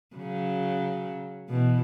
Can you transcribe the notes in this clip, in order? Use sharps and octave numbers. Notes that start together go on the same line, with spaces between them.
C#3 F#3
B2 E3